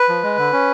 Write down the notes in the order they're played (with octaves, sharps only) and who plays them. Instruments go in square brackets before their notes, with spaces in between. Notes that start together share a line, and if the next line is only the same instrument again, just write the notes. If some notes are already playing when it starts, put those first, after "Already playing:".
Already playing: [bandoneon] B4
F3
G#3
D3
C#4